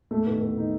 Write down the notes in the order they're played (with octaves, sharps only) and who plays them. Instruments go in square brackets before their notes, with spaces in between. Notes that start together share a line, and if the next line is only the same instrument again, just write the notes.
[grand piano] E2 A3
D#3 B3
E2 B3
D#3 D#4